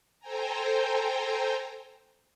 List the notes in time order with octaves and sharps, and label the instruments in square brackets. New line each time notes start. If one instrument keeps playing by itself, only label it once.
[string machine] A4 C5 G5 G#5 A#5